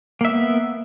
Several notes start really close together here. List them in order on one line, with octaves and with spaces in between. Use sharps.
A#3 E5 B3